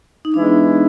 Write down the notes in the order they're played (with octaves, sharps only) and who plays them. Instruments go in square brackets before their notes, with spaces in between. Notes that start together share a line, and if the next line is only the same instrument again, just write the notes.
[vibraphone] D#4
[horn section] E3 G#3 B3 E4 [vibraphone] D4